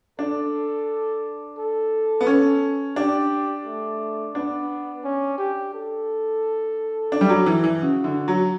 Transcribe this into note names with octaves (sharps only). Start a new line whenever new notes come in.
D4 A4
A4
B3
C#4
D4 G4
A3
B3 D4
C#4
G4
A4
D4
G3
F#3
E3
E3
C#3 F#4
D3
F#3